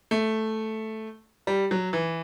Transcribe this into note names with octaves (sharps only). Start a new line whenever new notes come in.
A3
G3
F#3
E3